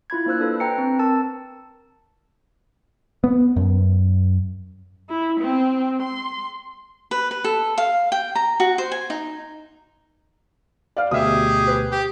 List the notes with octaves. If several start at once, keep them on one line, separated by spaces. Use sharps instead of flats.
E4 F4 B5 G#6
A#3 D4 C5 E6 F#6
D4 A4 B4
B4 G5 A#5 C#7
C4
A#4 A5 E6
B3
F#2
E4
C4
C6
B4
B4
A4
F5
G5
A#5
F#4
C5
G#5
D#4
D5 F5
D2 B2 G4 G#4 E5 D#6
B4
G4